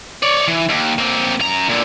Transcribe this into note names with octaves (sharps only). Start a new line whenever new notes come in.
C#5 D5
E3
D#2
A#3 C4
F#2 A#5
A#2 D3